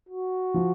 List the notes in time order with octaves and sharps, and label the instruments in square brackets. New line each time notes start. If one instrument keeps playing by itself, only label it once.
[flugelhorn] F#4
[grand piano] F3